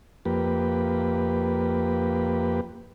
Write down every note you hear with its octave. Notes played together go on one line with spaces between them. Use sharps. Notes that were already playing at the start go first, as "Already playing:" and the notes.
F2 A#3 G4 B4